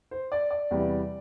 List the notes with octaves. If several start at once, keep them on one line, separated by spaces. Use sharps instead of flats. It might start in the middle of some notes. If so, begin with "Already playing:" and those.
C5
D5
D5
E2 C3 E3 G3